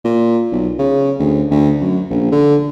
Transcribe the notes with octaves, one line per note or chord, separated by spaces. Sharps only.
A#2
B1
C#3
D2
D2
F#2
A#1
D3